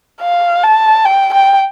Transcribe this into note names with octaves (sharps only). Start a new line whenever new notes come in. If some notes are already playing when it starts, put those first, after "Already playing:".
F5
A5
G5
G5